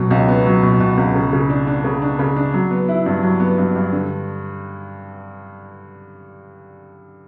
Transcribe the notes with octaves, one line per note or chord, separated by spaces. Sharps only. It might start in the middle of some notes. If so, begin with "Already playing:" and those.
Already playing: B2 F#3
C#2
B3
F#3
B2
B2
C#2
C#3
C#3
D4
D4
C#3
D4
C#3
D4
F#3
B3
E4
G2
F#3
B3
G2
G2
D3